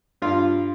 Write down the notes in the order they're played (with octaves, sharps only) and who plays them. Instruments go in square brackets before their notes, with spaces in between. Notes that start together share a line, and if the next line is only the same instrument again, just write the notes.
[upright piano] G2 [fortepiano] F4